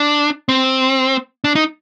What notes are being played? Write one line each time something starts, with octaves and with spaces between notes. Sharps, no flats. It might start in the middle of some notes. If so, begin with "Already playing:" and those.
Already playing: D4
C4
D4
D#4